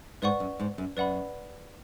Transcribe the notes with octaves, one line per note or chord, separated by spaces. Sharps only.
G#2 B4 D5 F#5 C#6
F#2
G#2
F#2
F#2 B4 D5 F#5 B5